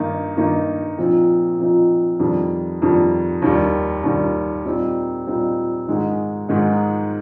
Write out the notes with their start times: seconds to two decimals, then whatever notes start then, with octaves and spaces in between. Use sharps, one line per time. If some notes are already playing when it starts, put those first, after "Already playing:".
Already playing: G2 D#3 A#3 D#4
0.36 G2 D#3 A#3 D#4
0.98 A#2 F3 C4 D#4
1.59 A#2 F3 C4 D#4
2.20 F2 D#3 G3
2.82 F2 D#3 G3
3.42 D#2 D#3 G3
4.04 D#2 D#3 G3
4.65 A#2 G3 C4 D#4
5.27 A#2 G3 C4 D#4
5.87 G#2 D#3 G#3 D#4
6.49 G#2 D#3 G#3 D#4